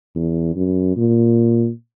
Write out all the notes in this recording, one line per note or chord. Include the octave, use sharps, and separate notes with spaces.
E2
F#2
A#2